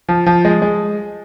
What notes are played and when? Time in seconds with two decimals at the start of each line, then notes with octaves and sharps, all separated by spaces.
0.09 F3
0.26 F3
0.45 G#3
0.62 G#3